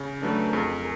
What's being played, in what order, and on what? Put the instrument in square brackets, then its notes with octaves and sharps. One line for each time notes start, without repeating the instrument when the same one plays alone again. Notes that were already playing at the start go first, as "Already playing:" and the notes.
Already playing: [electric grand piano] C#3
[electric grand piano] F#3 A3 D4 [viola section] A4 B4
[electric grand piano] F2 [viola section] G#4 A#4